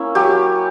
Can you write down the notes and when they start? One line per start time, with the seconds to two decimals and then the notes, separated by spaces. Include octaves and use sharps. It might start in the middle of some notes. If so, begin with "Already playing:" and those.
Already playing: A#3 C#4 E4
0.15 F#3 G4